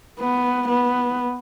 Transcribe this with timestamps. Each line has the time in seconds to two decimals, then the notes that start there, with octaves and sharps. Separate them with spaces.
0.20 B3
0.68 B3